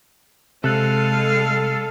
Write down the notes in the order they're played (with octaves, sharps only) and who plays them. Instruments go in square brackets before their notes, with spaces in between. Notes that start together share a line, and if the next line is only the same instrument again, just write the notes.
[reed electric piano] C3 F#6 [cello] G#3 F5 [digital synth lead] A4